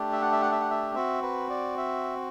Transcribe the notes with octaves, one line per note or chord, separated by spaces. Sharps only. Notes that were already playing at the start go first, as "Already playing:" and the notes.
Already playing: A3 D4 G4
E5
F#5
E5
F#5
E5
F#5
E5
C4 F#4 E5
B4
D5
E5